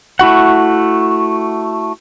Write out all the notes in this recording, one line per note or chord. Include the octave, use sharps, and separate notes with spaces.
A3 E4 F#4 F#5